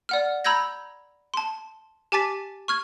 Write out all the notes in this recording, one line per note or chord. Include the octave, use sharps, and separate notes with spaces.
D5 F#5 F6
A#5 B5 E6 G6 G#6 A#6
A5 C6
G4 G#5 A5 D6 A6 B6
C#6 F6 G#6